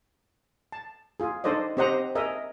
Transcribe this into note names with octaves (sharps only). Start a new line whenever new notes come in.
A5
F4 G#4
D4 D#4 A4 C5 D5 D#5
C4 G4 C5 D#5 F#5 A#5
G#4 A#4 D#5 E5